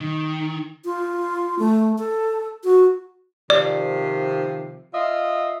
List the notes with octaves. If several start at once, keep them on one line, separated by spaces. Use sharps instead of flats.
D#3
F4
A3
A4
F#4
C3 D#3 F3 D5
F4 D#5 E5